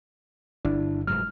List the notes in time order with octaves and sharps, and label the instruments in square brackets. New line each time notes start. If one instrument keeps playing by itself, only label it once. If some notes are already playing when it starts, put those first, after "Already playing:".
[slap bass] G1 [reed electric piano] D4 E4
[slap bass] F1 G#2 F#3 [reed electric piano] F6